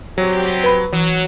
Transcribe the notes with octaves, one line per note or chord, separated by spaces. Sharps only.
F#3 G3 C4 G4
B4 B5
E3 F#3